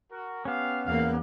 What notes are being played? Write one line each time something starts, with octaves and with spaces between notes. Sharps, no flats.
F#4 A#4
B3 C#4 G4 F5
E2 A#3 F5